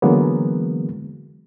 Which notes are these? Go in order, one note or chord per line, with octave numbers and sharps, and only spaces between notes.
D3 E3 F#3 G#3 A#3 B3